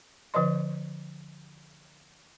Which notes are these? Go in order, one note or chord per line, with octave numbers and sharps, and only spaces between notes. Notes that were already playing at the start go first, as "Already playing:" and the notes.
D3 F3 B4 D#5 C6